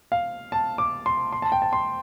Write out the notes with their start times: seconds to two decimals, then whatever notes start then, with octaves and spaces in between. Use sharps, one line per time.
0.12 F5
0.52 A5
0.78 D6
1.06 C6
1.33 C6
1.42 A5
1.52 G5
1.62 A5
1.73 C6